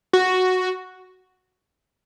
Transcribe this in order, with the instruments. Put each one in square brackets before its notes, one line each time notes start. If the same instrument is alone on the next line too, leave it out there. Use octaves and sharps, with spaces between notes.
[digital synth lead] F#4